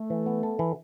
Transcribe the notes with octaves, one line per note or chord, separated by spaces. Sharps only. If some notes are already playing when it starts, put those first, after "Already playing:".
Already playing: A3
E3
B3
A4
E3